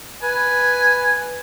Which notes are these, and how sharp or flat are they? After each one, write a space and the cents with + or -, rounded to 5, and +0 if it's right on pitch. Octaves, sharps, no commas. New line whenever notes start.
B4 +0 G#5 +0